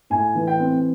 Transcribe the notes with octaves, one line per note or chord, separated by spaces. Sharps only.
A2 G#5
E3
G5
C4